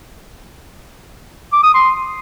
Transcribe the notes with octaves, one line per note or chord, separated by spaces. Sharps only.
D6
D#6
C6